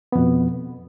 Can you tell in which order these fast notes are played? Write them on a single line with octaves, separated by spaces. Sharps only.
B3 F2 B2